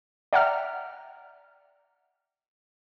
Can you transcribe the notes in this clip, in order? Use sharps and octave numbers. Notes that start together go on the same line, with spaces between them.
D5 E5 F#5 G5 A#5 F6